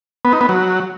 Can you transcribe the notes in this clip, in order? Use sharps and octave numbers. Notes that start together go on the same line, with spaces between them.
B3
D#4
B3
F#3